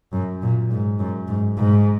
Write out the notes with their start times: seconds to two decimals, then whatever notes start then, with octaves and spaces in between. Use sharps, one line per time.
0.12 F#2
0.42 A#2
0.71 G#2
0.99 F#2
1.28 G#2
1.57 G#2